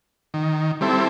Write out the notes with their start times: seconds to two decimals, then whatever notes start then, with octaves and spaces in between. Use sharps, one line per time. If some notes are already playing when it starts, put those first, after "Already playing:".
0.34 D#3
0.81 G3 C4 E4 A4